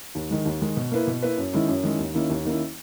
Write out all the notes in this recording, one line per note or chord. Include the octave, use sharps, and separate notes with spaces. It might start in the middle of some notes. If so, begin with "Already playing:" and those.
D#2
D#3 G#3
D#2
D#3 G#3
B2
A#3 E4 B4
B2
A#3 E4 B4
F#2
D#3 G#3 C#4 E4
F#2
D#3 G#3 C#4 E4
D#2
D#3 A#3 C#4 E4
D#2
D#3 A#3 C#4 E4